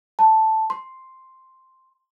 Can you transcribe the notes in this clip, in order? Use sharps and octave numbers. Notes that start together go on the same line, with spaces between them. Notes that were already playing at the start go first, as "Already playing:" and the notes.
A5
C6